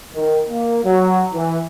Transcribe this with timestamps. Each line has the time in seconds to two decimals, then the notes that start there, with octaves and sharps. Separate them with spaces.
0.14 D#3
0.50 A#3
0.85 F#3
1.34 E3